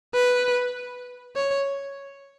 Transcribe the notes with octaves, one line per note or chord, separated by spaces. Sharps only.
B4
C#5